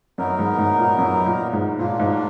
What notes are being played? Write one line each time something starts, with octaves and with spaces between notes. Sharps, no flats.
F#2 F#3 B3 D#4 A#4
G#2
G#2
A#2
F#2
A#2
G#2
A#2 F#3 A#3 D4 F4
G#2